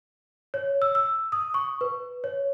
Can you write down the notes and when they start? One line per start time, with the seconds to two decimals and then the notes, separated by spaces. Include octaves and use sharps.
0.54 C#5
0.82 E6
0.95 E6
1.32 D#6
1.54 C#6
1.81 B4
2.24 C#5